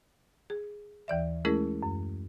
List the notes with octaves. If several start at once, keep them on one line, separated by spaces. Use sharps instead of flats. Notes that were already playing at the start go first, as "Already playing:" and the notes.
G#4
D#2 E3 D5 E5
G#3 A3 C#4 E4 G#4 A#4
F#2